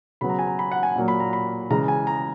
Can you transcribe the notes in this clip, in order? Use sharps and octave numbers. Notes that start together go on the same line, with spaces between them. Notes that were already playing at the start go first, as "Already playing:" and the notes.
C#3 F#3 B3 B5
A#5
G#5
A#5
B5
F#5
G#5
A#2 F#3 A#3
B5
A#5
B5
C#3 E3 G#3 A#5
G#5
A#5